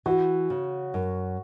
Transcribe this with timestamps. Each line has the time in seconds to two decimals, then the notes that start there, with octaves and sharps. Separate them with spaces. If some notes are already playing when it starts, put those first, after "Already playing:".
0.06 E3 F#4
0.50 C#3
0.94 F#2